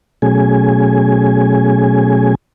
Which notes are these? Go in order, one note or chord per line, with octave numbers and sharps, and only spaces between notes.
B2 F#3 A3 C#4 G#4 G#5